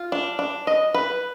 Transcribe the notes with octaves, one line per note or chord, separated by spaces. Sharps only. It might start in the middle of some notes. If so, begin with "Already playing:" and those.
Already playing: F4
D4
D4
D#5
B4